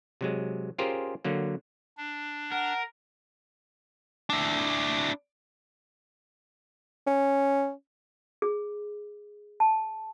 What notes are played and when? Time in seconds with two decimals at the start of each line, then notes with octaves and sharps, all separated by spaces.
0.21 C3 F#3 G#3
0.78 C#4 F4 G4 G#4 A#4 C5
1.25 D3 F#3 A#3
1.98 D4
2.52 A#4 F#5
4.30 D4 E4
7.07 C#4
8.42 G#4
9.60 A5